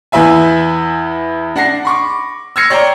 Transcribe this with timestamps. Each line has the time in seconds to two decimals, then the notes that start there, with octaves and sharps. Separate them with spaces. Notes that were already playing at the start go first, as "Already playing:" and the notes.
0.12 E2 E4 B4 E5 G#5
1.56 D4 F#5 A#6 C7
1.85 B5 C#6 D6
2.56 E6 F6 G#6 A#6 C7 C#7
2.70 C#5 D5 G5 A#5 D6